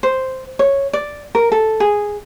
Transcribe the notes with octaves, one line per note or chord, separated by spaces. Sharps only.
C5
C#5
D5
A#4
A4
G#4